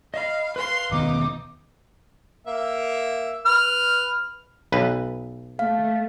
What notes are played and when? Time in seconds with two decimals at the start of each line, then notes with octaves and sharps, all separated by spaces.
0.14 D#5 F5 B5
0.56 B4 F5 C6
0.92 E1 D#3 B3 D#4 D6
2.47 A#3 E5
3.46 B4 F6
4.72 B1 B4
5.59 A3 F5